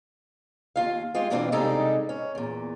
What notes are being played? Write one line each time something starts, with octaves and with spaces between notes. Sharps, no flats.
D#2 F4 F5
G#3 F4 G4
B2 E3 A#3 C4 D4 F4
C3 G3 G#3 D4 D#4 A4
C#4
E2 A#2